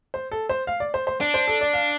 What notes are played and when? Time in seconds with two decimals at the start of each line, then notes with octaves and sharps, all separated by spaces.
0.14 C5
0.32 A4
0.49 C5
0.67 F5
0.80 D5
0.94 C5
1.07 C5
1.21 D4 D5
1.34 C5
1.48 A4
1.61 D5
1.74 F5